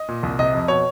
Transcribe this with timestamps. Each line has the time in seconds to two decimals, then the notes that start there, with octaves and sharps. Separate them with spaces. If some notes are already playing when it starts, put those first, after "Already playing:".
Already playing: D#5
0.09 A#2
0.23 C2
0.39 C3 D#5
0.54 F2
0.68 B2 C#5